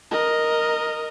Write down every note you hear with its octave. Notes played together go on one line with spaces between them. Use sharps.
A#4 D#5